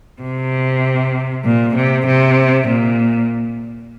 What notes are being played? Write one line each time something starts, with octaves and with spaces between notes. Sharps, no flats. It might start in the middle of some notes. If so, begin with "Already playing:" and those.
C3
A#2
C3
C3
A#2